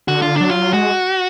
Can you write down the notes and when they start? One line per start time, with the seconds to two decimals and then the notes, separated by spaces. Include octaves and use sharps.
0.07 D3 F#4
0.22 F4
0.36 D4
0.41 F#3
0.50 F4
0.73 G#3 F#4